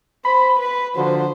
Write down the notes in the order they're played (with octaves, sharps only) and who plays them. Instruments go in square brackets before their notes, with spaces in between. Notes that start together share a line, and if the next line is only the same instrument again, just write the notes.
[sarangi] C5 [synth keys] B5
[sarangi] B4
[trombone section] D3 F3 F#3 [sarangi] C5